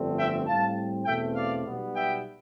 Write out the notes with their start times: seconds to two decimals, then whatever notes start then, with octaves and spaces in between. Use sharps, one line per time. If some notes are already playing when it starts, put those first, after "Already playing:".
Already playing: G1 F2 D3 A3 C4
0.17 E5 G5
0.46 A2 G3 C4 F5 A5
1.05 E2 B2 A3 C4 E5 G5
1.35 D5 F5
1.65 B1 B2 G3 B3
1.94 E5 G5